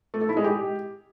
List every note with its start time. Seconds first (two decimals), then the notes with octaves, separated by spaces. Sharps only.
0.14 A3
0.21 A4
0.29 E4
0.37 G#3
0.44 G4